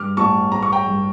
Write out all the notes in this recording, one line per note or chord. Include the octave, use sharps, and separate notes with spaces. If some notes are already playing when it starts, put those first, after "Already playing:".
Already playing: G2 D6 F6
A1 A5 C#6
A1 A#5
C#6
G5 A#5
G2